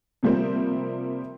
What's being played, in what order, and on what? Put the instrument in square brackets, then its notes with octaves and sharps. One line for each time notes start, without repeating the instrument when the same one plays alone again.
[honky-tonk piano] C3 F3 G3 A#3 C4